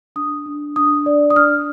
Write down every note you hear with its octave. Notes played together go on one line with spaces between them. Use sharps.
D4 D#6
D4
D4 D#6
D5
D#6
D4 F6